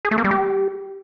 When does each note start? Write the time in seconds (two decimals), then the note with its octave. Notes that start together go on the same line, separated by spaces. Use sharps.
0.05 G#4
0.11 A3
0.18 A#3
0.24 G3
0.31 G4